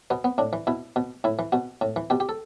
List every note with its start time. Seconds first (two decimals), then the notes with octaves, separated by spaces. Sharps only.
0.10 B2 B3
0.24 B3
0.38 A2 D4
0.53 E3
0.67 B2 E4
0.96 B2
1.24 A2 E4
1.39 E3
1.52 B2 F#4
1.81 A2
1.96 E3
2.10 B2 G4
2.20 G4
2.29 A4